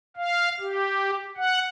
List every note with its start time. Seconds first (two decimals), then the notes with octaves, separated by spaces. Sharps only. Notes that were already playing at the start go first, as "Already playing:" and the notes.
0.17 F5
0.60 G4
1.37 F#5